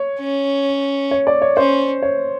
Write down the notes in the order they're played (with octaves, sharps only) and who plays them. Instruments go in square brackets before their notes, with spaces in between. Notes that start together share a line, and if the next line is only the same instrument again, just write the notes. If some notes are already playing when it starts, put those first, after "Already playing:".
Already playing: [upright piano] C#5
[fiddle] C#4
[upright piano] C#5
D5
C#5
[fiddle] C#4 [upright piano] C5
[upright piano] C#5